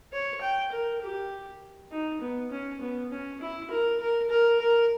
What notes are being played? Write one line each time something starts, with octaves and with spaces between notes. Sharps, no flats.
C#5
G5
A#4
G4
D#4
B3
C#4
B3
C#4
E4
A#4
A#4
A#4
A#4